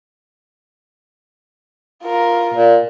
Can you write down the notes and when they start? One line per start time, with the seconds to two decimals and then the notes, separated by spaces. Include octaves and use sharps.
2.04 F4 A#4
2.54 A#2